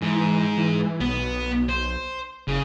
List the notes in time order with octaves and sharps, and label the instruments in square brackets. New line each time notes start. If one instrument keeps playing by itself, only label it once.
[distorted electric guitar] G#2 [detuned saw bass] E3
[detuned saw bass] E3
[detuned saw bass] B1 [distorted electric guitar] B3
[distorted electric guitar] C5
[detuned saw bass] F#1 [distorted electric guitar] C#3